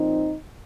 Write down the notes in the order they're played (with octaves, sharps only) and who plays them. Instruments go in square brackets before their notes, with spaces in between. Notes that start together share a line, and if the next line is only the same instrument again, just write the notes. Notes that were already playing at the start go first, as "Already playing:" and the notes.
Already playing: [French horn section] A#2 F3 C4 D#4